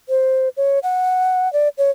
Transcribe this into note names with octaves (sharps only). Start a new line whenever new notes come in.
C5
C#5
F#5
D5
C#5